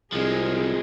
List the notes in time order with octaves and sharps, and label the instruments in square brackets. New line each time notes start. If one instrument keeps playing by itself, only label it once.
[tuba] C2 [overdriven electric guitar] F3 G#3 [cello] C4 G#4